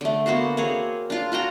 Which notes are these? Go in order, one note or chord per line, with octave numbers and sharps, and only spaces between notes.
D3 A3
A#3 B3 F#4 C5
A#3 C4 G#4 C#5
D4 F4
F4 F#4 G5 A#5